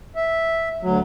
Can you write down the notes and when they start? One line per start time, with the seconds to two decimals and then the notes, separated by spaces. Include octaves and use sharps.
0.16 E5
0.82 D2 F#3